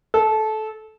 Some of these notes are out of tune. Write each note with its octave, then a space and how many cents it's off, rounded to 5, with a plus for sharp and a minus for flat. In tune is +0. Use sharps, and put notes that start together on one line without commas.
A4 -20